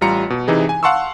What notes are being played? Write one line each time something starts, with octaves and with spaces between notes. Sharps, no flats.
A1 G3 F4 A#5 C#7
B2
C3 E3 D#4 G#4
G#5
F5 F#5 A5 C6 C#6 E6